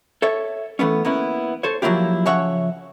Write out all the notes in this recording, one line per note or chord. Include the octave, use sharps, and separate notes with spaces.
A4 C#5 E5
E3 A3 B3 C#4
A#3 B3 C#4 E4
A4 C5 C#5
F3 F#3 A#3 E4 F4 G4
C#3 F3 C#5 E5 F#5